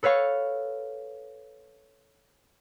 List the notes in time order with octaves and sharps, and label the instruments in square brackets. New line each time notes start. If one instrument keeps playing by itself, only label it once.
[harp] A4 B4 C#5 F5 C#6